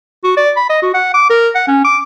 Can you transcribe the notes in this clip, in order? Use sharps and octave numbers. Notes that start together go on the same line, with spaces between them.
F#4
D5
B5
D#5
F#4
F#5
D6
A#4
F#5
C#4
D6